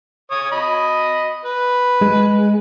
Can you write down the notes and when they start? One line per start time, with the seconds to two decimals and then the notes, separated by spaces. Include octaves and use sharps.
0.31 C#5 D#6
0.52 D#5 B5
1.45 B4
2.02 G#3